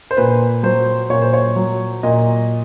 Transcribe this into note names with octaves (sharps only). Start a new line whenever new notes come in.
C5
A#2 B4
F#3 C5
A#2 C#5
C5
C#5
F#3
A#2 D#5